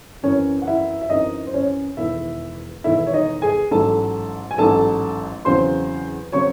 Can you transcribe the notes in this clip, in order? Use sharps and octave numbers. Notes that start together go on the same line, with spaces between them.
F#2 E3 C4 C#4 C#5
F#5
E4 E5
E5
F#2 E3 C4 D#4 D#5
C5
C#4 C#5
E1 E2 D#3 E4 E5
E1 E2 D#3 E4 E5
C#5
D#4 D#5
G#4 G#5
A1 G#2 F#3 A4 A5
G#5
A1 G#2 F#3 A4 A5
E2 C#3 F#3 C4 C5 C6
C#3 F#3 C4 C#5 C#6